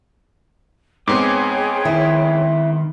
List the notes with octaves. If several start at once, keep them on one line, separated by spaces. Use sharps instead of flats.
G#2 B3 C4 G#4 C#5 G5 D6
D#3 E4